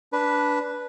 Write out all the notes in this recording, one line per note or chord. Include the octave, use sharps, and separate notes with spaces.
D4 B4